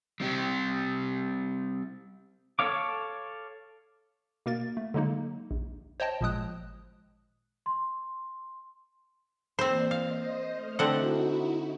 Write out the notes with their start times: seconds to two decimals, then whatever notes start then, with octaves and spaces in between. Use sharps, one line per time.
0.20 G3 C4 G4
2.59 A4 C#5 F5 D6
4.46 B2 A#3 A#4 A6
4.77 A3
4.94 D3 F#3 G#3 A#3 D#4
5.51 A#1
6.00 C5 C#5 D#5 G5 A5
6.21 G#1 A#2 F3 G#3 D#6 F#6
7.66 C6
9.59 E3 A#3 C4 C5 D5
9.91 C5 D#5 F5
10.49 A3 F6
10.79 D3 C4 D#4 E4 F#4 F#5